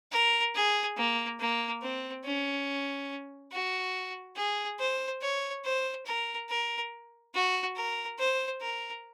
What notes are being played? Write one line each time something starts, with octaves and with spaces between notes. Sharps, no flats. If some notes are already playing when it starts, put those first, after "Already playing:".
A#4
G#4
A#3
A#3
C4
C#4
F#4
G#4
C5
C#5
C5
A#4
A#4
F#4
A#4
C5
A#4